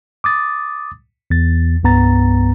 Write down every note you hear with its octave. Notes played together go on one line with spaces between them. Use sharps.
D6 D#6 A6
E2 A6
C2 G2 B3 A#5 A6